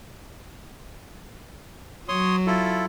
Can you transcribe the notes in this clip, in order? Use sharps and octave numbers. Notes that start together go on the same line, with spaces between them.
F#3 C#5 C6 D#6
E4 F4 A4